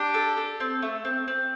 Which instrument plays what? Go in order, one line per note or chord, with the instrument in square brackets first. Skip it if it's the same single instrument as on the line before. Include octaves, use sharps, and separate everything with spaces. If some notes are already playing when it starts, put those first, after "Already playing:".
Already playing: [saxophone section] D4 G4
[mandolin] A4
A4
C4
A3
C4
C4